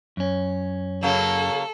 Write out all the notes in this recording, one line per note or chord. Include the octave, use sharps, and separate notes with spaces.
F#2 C#4
C#3 F#3 A#3 A4